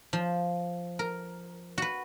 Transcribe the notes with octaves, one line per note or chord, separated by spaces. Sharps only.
F3
A#4
F#4 B4